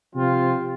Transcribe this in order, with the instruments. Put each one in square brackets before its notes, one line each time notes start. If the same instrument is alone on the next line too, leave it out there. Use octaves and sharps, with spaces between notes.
[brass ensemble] C3 F3 C4 F4